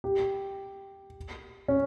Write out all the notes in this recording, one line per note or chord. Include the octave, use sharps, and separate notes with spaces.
G4
C#4